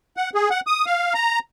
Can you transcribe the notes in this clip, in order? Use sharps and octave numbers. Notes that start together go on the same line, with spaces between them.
F#5
G#4
F#5
D#6
F5
A#5